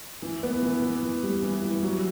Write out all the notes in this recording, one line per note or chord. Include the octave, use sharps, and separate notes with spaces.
E3
B3
E3
E3
E3
G3
E3
E3
F#3